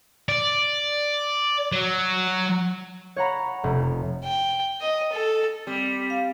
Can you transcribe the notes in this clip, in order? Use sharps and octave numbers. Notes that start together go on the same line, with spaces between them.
D5
F#3
C#5 F#5 A#5 B5
F1
G5
D#5
A4
G3 C4
F5